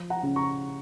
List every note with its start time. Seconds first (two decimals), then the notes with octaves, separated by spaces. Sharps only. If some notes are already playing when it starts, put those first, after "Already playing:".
Already playing: F3
0.10 F#5 A#5
0.23 C#3
0.36 A#5 C#6